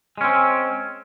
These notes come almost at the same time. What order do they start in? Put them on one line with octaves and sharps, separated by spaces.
G#3 C#4 C4